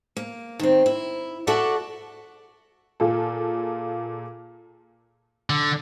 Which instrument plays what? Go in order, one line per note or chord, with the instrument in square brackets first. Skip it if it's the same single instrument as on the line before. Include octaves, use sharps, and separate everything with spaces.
[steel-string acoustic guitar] A#3
D#3 C4
E4
F#4 A4 D5 E5 F#5
[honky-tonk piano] A#2 F4 G#4 A4
[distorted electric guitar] D3